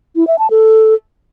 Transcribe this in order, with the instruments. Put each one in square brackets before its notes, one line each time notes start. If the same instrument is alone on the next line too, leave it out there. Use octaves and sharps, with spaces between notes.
[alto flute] E4
E5
A5
A4